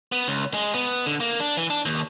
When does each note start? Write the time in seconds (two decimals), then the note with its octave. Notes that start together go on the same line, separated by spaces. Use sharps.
0.12 B3
0.28 C#2
0.54 G#3
0.74 B3
1.06 D3
1.20 A#3
1.40 D4
1.57 E3
1.70 D4
1.85 D#2